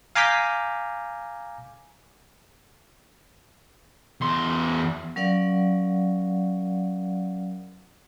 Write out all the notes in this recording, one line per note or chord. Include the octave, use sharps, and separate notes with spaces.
F5 G#5 A#5 D6 G6 B6
E2 C6
F#3 C#4 A#4 D5 F5 F#5